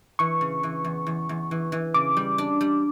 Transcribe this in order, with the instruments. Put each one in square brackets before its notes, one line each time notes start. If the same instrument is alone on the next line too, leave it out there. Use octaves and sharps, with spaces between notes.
[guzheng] E3 [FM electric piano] C#6
[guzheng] C#3
E3
E2
E2
E2
E3
E3
[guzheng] C#3 [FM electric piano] D6
[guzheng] G3
D4
G3